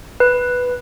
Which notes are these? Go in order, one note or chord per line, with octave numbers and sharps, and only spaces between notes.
B4